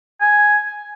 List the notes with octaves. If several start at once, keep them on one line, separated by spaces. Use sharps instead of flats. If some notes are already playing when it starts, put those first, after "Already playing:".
G#5